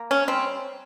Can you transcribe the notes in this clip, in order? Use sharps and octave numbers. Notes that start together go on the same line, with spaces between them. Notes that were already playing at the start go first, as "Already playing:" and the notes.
Already playing: A#3
C#4
G3 C4